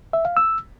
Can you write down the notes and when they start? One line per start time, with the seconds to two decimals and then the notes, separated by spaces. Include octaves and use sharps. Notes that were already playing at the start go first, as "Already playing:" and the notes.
0.13 E5
0.25 F5
0.37 E6